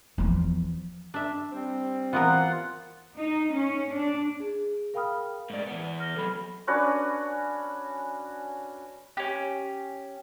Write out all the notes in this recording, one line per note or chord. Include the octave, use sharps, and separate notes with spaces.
E2 F3
D4 E5
G3 C4
E3 B3 F4 A#4 F#5
D#4
C#4
D4
G#4
A#4 F5 G5 B5 D#6 F6
G#2 D5
E3 B3
F6 A#6 G7
C3 F#3 A4 B5
C#4 D4 F#4 B4
C#4 G4